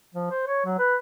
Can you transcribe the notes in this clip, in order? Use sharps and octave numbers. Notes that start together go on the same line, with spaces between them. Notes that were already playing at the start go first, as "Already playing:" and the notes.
F3
C5
C#5
F#3
B4